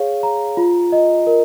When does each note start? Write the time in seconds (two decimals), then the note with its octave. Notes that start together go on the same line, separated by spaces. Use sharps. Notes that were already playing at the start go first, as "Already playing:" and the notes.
Already playing: G#4 C#5 F5
0.23 A#5
0.57 F4
0.92 D#5
1.27 A#4